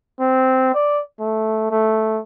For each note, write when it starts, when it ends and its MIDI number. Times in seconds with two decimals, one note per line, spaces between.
0.19 0.72 60
0.74 1.02 74
1.20 1.67 57
1.71 2.19 57